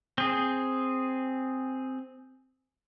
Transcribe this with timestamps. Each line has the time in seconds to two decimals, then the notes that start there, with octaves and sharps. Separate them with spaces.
0.18 C4 G#4